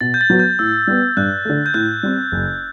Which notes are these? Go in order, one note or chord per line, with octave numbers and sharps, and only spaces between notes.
B2 A6
G6
A6
F#3 B3 F#4
G6
A2 E6
G3 B3
G2 F#6
D3 A3
G6
A2 F#6
G3 C4
F#1